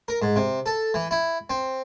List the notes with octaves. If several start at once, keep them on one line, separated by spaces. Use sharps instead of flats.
A#4
G#2
C3
A4
E3
E4
C4